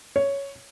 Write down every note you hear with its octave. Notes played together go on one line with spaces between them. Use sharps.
C#5